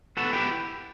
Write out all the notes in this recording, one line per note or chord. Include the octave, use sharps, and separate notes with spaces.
B3 F#4 A4
E4 G4